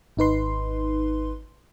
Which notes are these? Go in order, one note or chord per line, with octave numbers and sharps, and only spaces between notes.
G#1 D#4 B4 C6